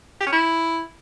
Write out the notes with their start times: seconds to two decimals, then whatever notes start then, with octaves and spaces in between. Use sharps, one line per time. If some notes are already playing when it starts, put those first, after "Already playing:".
0.20 G4
0.27 C#4
0.33 E4